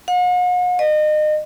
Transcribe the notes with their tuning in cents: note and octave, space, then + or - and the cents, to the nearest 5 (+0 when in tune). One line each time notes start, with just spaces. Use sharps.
F#5 -45
D#5 -35